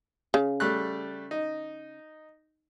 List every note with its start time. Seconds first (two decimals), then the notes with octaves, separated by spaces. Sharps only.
0.34 C#3
0.60 G3 A3 F#6
1.31 D#4